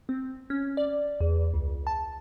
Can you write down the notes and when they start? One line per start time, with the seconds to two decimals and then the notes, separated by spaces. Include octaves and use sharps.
0.09 C4
0.50 C#4
0.77 D5
1.21 E2
1.54 C#2
1.87 A5